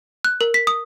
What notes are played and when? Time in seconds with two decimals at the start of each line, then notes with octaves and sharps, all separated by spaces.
0.25 F#6
0.41 A#4
0.54 B6
0.67 D#6